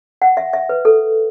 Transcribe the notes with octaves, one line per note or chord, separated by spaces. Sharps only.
F#5
E5
E5
B4
A4